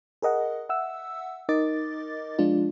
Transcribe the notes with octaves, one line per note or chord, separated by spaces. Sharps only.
G#4 A#4 D#5 F#5
E5 F#5 E6
D#4 A#4 D#5 D6 A6
F3 G#3 D4 F4